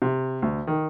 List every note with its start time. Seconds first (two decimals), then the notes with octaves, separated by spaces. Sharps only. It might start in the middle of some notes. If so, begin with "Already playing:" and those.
0.02 C3
0.42 D2
0.67 D#3